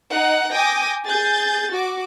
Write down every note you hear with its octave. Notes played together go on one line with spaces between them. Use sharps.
D#4 F#5
G5 G#5 D6 D#6 G6 A#6
G#4 G6 A6
F#4 D6